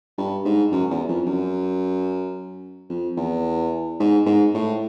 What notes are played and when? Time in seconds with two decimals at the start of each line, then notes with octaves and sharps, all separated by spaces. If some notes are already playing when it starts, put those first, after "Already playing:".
0.18 G2
0.45 G#2
0.72 F#2
0.91 E2
1.08 F2
1.26 F#2
2.90 F2
3.17 E2
4.00 G#2
4.26 G#2
4.54 A2